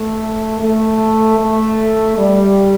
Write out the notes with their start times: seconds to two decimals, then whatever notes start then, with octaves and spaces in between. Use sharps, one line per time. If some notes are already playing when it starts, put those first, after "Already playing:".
Already playing: A3
0.61 A3
1.39 A3
2.17 G3